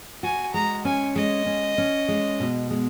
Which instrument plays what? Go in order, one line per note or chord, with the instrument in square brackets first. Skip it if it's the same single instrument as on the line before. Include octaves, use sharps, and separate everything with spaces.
[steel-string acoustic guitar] F#4 [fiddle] G#5
[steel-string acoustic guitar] G#3 [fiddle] A#5
[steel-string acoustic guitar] C#4 [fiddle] G#5
[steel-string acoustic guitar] G#3 [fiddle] D#5
[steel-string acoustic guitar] C#4
C#4
G#3
B2
G#3